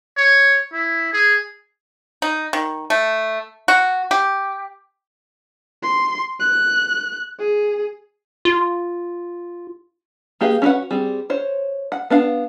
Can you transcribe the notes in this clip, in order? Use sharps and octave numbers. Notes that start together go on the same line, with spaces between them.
C#5
E4
G#4
D#4
D#3
A3
F#4
G4
C6
F#6
G#4
F4
A#3 G4 G#4 B4 F5
C#4 E4 F#4 B4 F#5
G3 C4 G#4
C5 C#5
F#5
B3 D4 F5